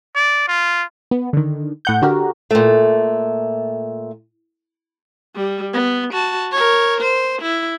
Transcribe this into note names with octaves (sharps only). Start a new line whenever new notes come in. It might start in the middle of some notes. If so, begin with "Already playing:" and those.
D5
F4
B3
D3 D#3
A2 F#5 G6
D3 F#4 G4 A#4
A#2 A3
G3
B3
F#4 A5
A#4 C#5
C5
E4